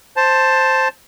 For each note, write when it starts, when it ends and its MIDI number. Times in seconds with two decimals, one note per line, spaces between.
0.17 0.88 72
0.17 0.88 81